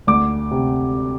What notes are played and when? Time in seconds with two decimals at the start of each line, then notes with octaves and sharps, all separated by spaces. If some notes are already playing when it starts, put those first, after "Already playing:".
0.07 D2 D6
0.51 C3